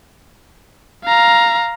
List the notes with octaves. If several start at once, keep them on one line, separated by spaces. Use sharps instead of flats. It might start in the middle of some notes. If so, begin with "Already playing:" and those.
F5 A#5